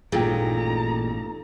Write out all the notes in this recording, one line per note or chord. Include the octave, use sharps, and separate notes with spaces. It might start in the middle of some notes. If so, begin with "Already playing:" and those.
A1 G2 A#2 D#4 G#4 A4 G5 A#5